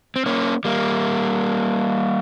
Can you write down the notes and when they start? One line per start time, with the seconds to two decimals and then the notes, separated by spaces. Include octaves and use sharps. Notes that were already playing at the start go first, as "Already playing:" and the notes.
0.16 C4
0.26 A#3 C#4
0.65 G3 A#3